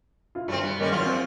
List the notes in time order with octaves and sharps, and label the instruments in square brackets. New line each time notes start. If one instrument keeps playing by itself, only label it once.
[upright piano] E4 F4
[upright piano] G2 [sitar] A3 C4
[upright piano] G3 [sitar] B3
[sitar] G3 G#3 C#4 [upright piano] A#3
[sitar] E2 E4 F4 [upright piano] F#3
[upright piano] C4 C5